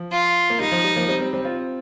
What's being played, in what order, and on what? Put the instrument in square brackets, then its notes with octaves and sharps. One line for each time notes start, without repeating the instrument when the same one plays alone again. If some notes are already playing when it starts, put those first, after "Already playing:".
Already playing: [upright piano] F3
[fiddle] F4
[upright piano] A#3
[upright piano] G3 [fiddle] D#4
[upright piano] F3
G3
F3 A#3
G3 C4
G3 C4
G3 C4
C4 F4